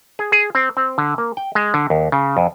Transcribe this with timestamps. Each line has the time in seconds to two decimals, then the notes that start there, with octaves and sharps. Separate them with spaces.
0.19 G#4
0.32 G#4
0.55 C4
0.77 C4
0.98 D3
1.18 A#3
1.37 G5
1.55 G#3
1.74 D3
1.90 D#2
2.12 C#3
2.37 F2